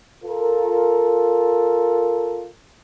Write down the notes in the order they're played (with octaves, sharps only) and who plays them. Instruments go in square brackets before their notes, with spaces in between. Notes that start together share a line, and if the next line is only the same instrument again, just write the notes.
[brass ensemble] F4 A4 A#4